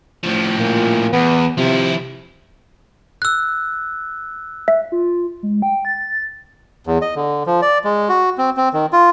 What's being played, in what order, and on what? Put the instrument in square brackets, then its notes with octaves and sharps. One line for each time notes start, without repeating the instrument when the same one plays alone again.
[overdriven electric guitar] A2 F3
[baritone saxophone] A#2
[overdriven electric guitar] E2 [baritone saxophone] B3
[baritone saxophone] C3 [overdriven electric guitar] F3 E4
[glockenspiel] E6 F#6
[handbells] E5
[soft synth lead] F4
G#3
G5
A6
[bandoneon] E2
D#5
D3
F3
D5
G#3
F#4
C4
C4
D#3
F4